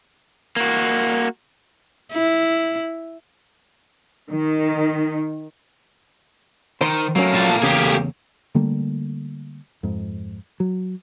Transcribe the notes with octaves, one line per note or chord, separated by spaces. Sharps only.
A#3 F#4
E4
D#3
D#3 C5 C6
F#3 A3 A#3 C#4
A#2 A5
E2 C#3 G4 G#4
D3 G3 A3 A#3
F2 G#2
F#3